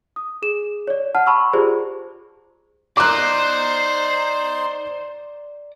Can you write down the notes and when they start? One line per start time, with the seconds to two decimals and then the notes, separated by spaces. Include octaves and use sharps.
0.16 D#6
0.42 G#4 E7
0.88 C#5 D5
1.15 F#5 A5 F6
1.26 A5 B5 C#6 E6
1.53 F4 G4 G#4 C5 D5
2.97 D#4 C5 D5 A#5 C6 D6 F#6